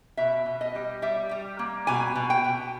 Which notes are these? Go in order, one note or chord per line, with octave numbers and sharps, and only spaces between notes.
B2 E5
B2
D#5
G3
G3 E5
G3
A#3
B2 G#5
B2
G5
B2